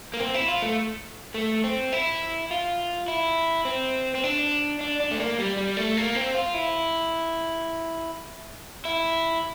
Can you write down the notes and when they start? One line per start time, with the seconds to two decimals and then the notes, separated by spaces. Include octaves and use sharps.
0.14 A#3
0.20 C4
0.34 E4
0.48 F4
0.62 A3
1.34 A3
1.64 C4
1.93 E4
2.51 F4
3.08 E4
3.65 C4
4.15 C4
4.24 D4
4.81 D4
5.00 D4
5.11 A3
5.20 A#3
5.39 G3
5.57 G3
5.77 A3
5.97 A#3
6.15 C4
6.35 F4
6.54 E4
8.85 E4